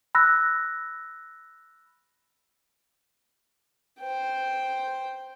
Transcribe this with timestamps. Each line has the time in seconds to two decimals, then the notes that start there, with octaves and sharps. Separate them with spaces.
0.15 B5 E6 F#6 A#6
4.01 C5 G5